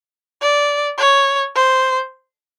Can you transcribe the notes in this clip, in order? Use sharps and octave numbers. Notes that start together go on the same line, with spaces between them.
D5
C#5
C5